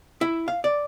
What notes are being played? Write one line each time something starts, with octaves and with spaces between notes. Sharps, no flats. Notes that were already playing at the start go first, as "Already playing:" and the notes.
E4
F5
D5